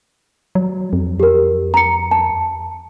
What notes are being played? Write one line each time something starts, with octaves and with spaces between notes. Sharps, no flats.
F#3
F2
G4 A#4
A#5 C#7
A5